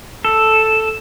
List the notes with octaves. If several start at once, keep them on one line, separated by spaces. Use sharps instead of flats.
A4